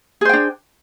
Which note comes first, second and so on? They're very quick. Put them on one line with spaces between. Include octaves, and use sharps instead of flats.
G#4 C5 G5 D4